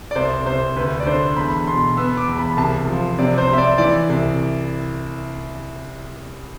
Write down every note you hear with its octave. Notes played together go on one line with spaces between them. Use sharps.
D5
C2 C5
C2 C5
D2 B4
D5
D3 C5
E2 B5
B2 C6
B3 E6
D6
E2
B5
C2 A5
F3
C3 D5
C5
C3
E5
D5
E3 D5
C2